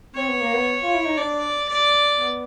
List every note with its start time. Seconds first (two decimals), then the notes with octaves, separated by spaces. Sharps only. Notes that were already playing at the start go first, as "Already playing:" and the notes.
0.15 C4 C#5
0.29 B3
0.41 A#3
0.54 B3
0.83 F4
0.94 E4
1.06 D#4
1.17 D4 D5
1.68 D5
2.19 B3